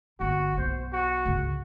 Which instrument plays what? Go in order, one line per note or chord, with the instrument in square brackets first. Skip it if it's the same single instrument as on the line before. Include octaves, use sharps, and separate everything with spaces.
[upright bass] G1 E4 [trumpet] F#4
[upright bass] B1 [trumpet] C5
[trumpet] F#4
[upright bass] C#2 G2